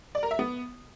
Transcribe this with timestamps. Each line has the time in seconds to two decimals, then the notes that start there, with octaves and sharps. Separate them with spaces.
0.15 D5
0.23 A#4
0.31 E5
0.39 B3